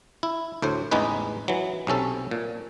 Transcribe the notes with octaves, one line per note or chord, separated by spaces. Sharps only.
E4
D2 A2 C5
A1 E2 G#3 D#4 B4
E3 F#3
B1 C3 C#4 A4
A#2